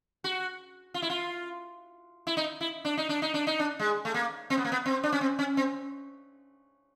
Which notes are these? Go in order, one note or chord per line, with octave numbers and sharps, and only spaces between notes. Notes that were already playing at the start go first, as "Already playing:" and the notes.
F#4
F4
E4
F4
E4
D#4
E4
D4
D#4
D4
D#4
D4
D#4
D4
G#3
A3
A#3
C4
B3
A#3
B3
C4
D4
C#4
C4
C#4
C4